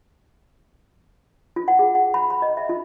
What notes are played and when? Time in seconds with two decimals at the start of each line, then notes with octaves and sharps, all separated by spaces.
1.56 F4
1.68 F#5
1.79 G#4
1.95 F#5
2.14 B5
2.30 B5
2.42 D#5
2.57 E5
2.69 F4